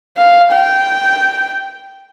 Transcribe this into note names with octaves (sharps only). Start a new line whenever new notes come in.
F5
G5